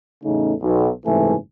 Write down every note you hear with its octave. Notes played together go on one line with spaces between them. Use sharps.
A1 E2 C#3 A3 D#4
B1
F#1 G#2 C3 E3 A3 G#5